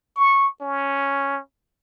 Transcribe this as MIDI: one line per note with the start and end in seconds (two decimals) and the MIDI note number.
0.16 0.49 85
0.61 1.40 61